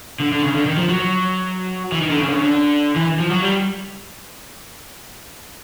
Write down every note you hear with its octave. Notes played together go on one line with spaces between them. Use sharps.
D3
D3
C#3
D3
D#3
F3
F#3
E3
D#3
D3
C#3
D3
C#3
D3
E3
F3
F#3
G3